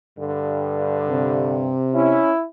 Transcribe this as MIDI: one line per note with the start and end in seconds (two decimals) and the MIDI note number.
0.18 1.74 43
0.18 1.62 50
1.09 2.20 48
1.94 2.31 61
1.94 2.44 64